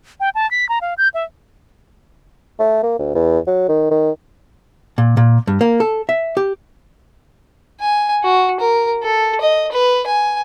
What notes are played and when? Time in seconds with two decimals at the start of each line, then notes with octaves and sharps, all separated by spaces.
0.20 G5
0.35 A5
0.51 B6
0.69 A#5
0.81 F5
0.98 G6
1.14 E5
2.59 A3
2.83 A#3
2.99 D2
3.15 E2
3.47 F#3
3.69 D#3
3.91 D#3
4.98 A#2
5.17 A#2
5.47 G2
5.61 A#3
5.80 A4
6.09 E5
6.37 G4
7.80 G#5
8.23 F#4
8.60 A#4
9.03 A4
9.40 D#5
9.72 B4
10.06 G#5